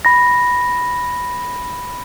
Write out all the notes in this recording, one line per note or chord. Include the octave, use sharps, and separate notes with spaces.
B5 A#6